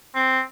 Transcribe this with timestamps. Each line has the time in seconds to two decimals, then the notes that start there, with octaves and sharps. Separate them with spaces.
0.15 C4